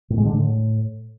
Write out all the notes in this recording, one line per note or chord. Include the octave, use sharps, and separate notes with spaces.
A2
G#3
D3
A2